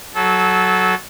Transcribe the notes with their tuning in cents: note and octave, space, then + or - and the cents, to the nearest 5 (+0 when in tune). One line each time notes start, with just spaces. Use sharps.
F#3 +0 A4 -25